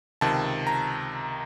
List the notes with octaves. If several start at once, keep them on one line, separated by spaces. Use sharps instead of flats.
C#2 C3 D#3 A5
A#5